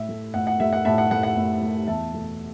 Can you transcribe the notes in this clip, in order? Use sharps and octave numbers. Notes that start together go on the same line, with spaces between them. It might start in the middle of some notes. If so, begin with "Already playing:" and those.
Already playing: A2 E5
A3
A2 F#5
F#5
A3 E5
F#5
A2 E5 A5
F#5
A3 F#5
F#5
A2
A3
E2 E5 A5
B2 A3